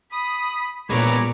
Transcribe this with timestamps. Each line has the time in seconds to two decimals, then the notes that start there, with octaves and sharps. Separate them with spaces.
0.12 B5 D#6
0.90 A#2 G#3 B3 C#5 A#5 B5 D6